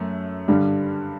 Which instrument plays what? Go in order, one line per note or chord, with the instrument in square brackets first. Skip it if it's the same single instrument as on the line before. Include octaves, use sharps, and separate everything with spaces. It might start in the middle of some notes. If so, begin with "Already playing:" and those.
Already playing: [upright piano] F#2 A3
G2 D3 G3